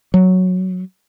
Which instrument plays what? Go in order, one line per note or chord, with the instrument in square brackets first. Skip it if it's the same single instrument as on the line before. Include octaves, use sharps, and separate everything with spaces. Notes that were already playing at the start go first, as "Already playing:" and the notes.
[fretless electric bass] F#3